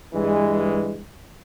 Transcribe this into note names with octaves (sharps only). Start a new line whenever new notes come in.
G2 E3 G#3